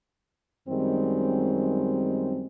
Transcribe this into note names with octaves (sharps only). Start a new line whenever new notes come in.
F#2 D#3 G3 G#3 C4